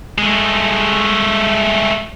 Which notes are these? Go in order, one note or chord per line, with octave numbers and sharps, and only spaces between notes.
G#3 A3